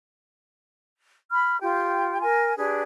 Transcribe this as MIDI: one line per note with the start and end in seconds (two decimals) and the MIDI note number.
1.30 1.58 83
1.30 1.58 89
1.60 2.20 65
1.60 2.20 67
1.60 2.20 79
2.21 2.54 70
2.21 2.54 80
2.56 2.83 62
2.56 2.83 67
2.56 2.83 68
2.56 2.83 71